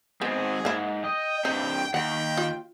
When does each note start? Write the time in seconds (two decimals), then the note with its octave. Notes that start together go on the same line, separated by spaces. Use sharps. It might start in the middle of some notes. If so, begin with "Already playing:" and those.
0.22 G#2 B3 C4 G#4
0.65 G#2 A#3 E4
1.04 D#5 G5
1.45 G2 C3 D#4
1.94 D#2 F#5 G5
2.37 F4